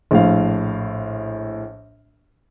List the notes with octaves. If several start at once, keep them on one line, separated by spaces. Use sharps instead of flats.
A#1 A2 F5